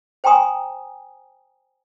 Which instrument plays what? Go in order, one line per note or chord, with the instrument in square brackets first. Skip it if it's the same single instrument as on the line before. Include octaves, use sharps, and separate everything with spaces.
[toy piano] C5 G5 G#5 A#5 C6 D#6